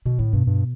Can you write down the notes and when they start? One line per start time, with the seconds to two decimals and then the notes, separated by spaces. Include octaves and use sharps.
0.05 B2 D3
0.19 A2 D3
0.33 G2 B2
0.47 G2